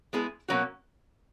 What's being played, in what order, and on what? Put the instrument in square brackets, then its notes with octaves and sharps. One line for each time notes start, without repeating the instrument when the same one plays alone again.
[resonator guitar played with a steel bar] G#3 B3 E4 G#4
B2 F#3 A#3 C#4 F#4